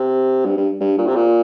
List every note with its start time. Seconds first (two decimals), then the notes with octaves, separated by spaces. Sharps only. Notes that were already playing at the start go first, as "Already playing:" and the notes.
Already playing: C3
0.45 G2
0.57 G2
0.80 G2
0.98 A#2
1.07 C3
1.15 A#2